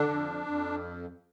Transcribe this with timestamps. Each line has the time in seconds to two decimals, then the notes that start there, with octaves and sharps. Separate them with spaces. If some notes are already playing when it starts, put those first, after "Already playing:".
Already playing: D3 D4
0.08 F2
0.46 F2